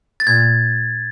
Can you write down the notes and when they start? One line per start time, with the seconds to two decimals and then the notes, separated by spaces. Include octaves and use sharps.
0.20 A6
0.27 A#2 G#6